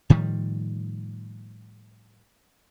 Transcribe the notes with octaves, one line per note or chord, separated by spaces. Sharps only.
A2 D#3 F3 G3